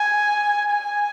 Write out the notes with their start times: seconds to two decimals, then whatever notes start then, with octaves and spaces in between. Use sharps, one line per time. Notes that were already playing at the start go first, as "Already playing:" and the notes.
Already playing: G#5
0.70 G#5